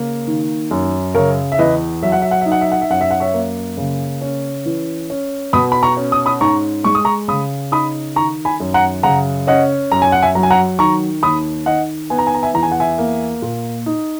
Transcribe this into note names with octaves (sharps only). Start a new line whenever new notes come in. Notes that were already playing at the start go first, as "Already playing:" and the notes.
Already playing: C#3 A#3
D#3
F#2
C#3 A#4 C#5
E5
E2 B4 D#5
F#3 E5
F#5
E5
F#5
D#4 E5
F#5
E5
F#5
E5
F#2 F#5
E5
F#5
C#5 E5
A#3
C#3
C#4
E3
C#4
B2 B5 D#6
B5
A#5 C#6
C#4
D#6
B5 D#6
G#2 A#5 C#6
G#3 C#6
D#6
A#5 C#6
C#3 B5 D#6
D#4 B5 D#6
D#3 A#5 C#6
G#5 B5
F#2
F#5 A#5
C#3 F#5 A#5
C#4 D#5 F#5
F#2 A#5
G#5
F#5
E5 G#5
F#3 A#5
G#5
F#5 A#5
D#3 A#5 C#6
D#2 B5 D#6
D#3 D#5 F#5
B3 G#5
A#5
G#5
A#5
E5 G#5
E2 A#5
G#5
F#5
E5 G#5
A#3
A#2
D#4